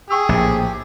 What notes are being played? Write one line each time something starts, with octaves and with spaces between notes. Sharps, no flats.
G#4 G5 C#6 E6
A#1 A2 G4